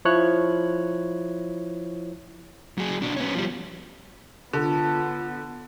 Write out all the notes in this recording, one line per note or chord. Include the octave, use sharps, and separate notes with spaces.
F3 E4 C#5 F#6
F#3 G#4
B2 D4
B3 C#4
F3 G3
D3 B3 F4 A4 C#5 F#5